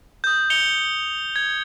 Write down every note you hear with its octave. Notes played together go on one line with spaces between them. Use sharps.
D#6 G6
C#7 F7 G7
G#6